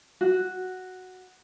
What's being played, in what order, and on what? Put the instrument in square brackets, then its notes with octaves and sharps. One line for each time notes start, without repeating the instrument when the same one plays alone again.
[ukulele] F#4